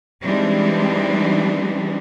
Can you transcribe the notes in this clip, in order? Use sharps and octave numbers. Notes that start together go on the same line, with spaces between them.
E3 G3 G#3 C4 D4 D#4